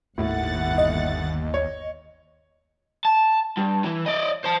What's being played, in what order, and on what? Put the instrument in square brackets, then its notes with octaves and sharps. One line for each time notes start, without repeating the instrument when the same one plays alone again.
[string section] G1 F#5 A6 [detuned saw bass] D#2 [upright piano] A2
[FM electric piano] D#5
[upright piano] C#5
[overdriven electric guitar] A5
G2
E3
D5 D#5
C5 A5